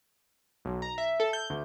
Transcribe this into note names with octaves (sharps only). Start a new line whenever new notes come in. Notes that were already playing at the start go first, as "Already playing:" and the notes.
B1
A#5
E5
A4
G6
D2